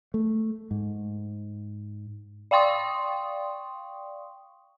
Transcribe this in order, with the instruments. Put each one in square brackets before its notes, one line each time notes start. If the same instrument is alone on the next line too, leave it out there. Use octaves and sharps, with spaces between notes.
[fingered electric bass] A3
G#2
[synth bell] D5 F5 G5 C6 C#6 D#6